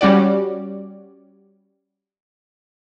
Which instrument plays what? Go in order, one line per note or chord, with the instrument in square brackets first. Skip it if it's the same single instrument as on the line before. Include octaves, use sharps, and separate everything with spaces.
[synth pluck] G3 C#4 F#4 D5